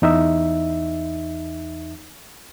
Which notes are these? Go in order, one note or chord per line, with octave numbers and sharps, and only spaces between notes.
E2 D#4 E5